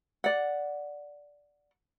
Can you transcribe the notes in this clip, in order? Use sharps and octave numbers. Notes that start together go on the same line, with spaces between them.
D5 F#5